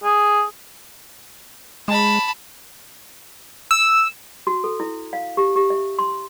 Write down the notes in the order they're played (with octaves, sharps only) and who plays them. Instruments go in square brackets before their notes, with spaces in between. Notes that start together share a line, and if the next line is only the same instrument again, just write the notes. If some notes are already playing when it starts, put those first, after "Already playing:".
[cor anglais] G#4
[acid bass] G#3 [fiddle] A5 B5
[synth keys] E6
[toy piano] F#4
A4
E4
F5
G4
G4
E5
C6